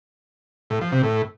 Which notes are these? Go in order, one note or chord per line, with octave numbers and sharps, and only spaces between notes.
A2
F3
C3
A2